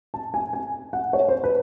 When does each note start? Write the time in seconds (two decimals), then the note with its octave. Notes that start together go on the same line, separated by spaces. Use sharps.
0.14 A5
0.34 G#5
0.53 G#5
0.93 F#5
1.13 C#5
1.29 C5
1.44 B4